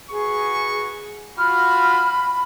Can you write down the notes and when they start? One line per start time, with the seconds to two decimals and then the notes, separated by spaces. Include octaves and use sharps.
0.10 F#4 G#4 B4 C#6
1.38 F4 F#4 B5 F6